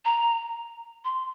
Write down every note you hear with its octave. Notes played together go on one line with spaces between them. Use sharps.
A#5
C6